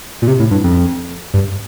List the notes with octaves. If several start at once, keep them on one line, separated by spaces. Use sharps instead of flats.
A#2
C3
A2
G2
F2
G2